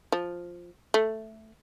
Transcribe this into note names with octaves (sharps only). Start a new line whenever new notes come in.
F3
A3